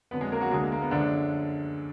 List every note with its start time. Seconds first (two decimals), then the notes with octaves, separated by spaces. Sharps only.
0.11 F2 D3 F#3 B3 B4
0.21 G#3 G#4
0.32 A#3 A#4
0.41 F#3 F#4
0.51 D2 D3 G#3 G#4
0.62 A#3
0.72 A#3
0.82 B3
0.91 F#2 D3 F3 G#3 D4